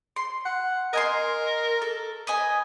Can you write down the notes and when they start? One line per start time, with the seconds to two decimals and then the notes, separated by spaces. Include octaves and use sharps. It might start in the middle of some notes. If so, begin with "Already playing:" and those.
0.16 C6
0.45 F#5
0.93 A#4 D#5 G#5 C6
1.82 A4
2.27 B4 D#5 G#5